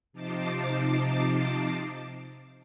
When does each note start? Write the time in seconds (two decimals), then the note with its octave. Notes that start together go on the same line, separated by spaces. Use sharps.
0.13 C3 F3 D#4 A5 D6 C7